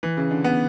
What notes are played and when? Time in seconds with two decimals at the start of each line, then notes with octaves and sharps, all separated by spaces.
0.03 E3
0.17 C#3
0.31 D3
0.44 B3